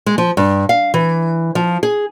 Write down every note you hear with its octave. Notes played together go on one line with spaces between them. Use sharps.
G#3
F3
G2
F5
E3
F3
G#4